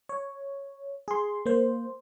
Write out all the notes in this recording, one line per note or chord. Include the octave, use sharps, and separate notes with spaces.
C#5
G#4 C6
A#3 C5